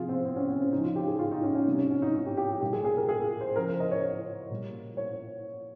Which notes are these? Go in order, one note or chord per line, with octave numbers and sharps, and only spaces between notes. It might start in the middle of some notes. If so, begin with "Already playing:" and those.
Already playing: C3 F3 F4 G#4
C4
C4
C#4
C4
C#4
C#3 F3 D#4
F4
G4
G#4
F4
D#4
C#4
C#4
C3 G3
C#4
C#4
D#4
D#4
G4
G4
G4
A#2 G3 G4
G#4
G#4
A#4
G#4
C5
C#3 F3 A#4
C5
D#5
C#5
C#5
A#2 G3
C#5